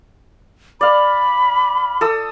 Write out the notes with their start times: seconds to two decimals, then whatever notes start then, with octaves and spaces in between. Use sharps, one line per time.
0.81 D5 F5 B5
2.01 A4 D#6 E6